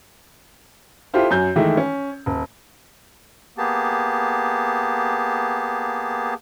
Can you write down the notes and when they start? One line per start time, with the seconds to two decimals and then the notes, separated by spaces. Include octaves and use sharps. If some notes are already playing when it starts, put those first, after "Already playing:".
1.14 E4 F4 G4 A4 C5 F5
1.31 F#2 G#5 G6
1.56 D#3 E3 G#3 A3 D#4 E4
1.77 C#4
2.26 D#1
3.58 A#3 B3 G4 G#4 A5